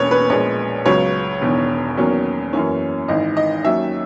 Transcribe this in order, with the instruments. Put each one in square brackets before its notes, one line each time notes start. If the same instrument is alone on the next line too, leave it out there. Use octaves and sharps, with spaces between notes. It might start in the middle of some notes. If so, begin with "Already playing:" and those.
Already playing: [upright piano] E1 E2 B2 A#3 C#4 B4 C#5
B4
A#1 A#2 G#3 B3 C#5
C#2 C#3 F#3 B3 C#5
E1 E2 D#3
E2 D#3 F#3 A#3 C#4
F#2 E3 A#3 C#4
G#1 G#2 E3 D#5
D#5
D#2 D#3 F#3 C#4 E5